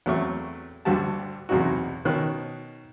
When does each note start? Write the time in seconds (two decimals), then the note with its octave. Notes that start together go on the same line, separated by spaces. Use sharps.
0.06 E2 F#3 A3 C4 C#5 C#6
0.85 D2 G2 D3 F#4 G4 A5
1.49 B1 E2 C3 F#3 D#4 F#4
2.05 B2 D#3 C#4 F#6